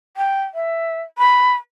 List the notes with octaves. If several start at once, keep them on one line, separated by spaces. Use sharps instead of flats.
G5
E5
B5